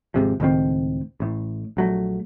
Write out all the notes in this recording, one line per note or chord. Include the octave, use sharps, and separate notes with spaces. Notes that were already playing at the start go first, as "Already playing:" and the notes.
G#1 G#2 C3 F3
C#2 A2 D#3 C4
A1 A2
A#1 F#3 A3